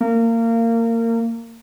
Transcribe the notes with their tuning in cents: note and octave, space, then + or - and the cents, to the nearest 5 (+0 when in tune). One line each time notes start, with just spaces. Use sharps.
A#3 -25